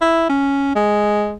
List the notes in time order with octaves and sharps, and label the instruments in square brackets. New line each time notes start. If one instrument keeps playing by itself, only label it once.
[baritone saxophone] E4
C#4
G#3